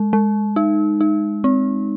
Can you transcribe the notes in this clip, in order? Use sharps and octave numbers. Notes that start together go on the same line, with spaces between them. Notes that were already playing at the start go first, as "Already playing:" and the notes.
Already playing: G#3
G#3
D#4
D#4
C4